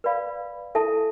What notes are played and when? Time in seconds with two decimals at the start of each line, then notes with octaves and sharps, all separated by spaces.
0.04 B4 D5 F5 B5
0.75 E4 A4 E5 A5